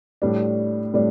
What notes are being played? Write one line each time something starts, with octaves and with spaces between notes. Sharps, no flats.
A2 G3 D4
A2 G3 D4